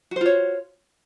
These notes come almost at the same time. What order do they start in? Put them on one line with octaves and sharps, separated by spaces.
F#4 C5 F4 C#5